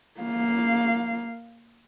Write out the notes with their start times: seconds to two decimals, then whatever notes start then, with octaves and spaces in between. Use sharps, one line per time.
0.20 A#3 F5